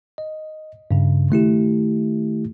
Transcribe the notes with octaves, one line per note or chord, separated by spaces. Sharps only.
D#5
G2 C#3
D#3 A3 E4 G4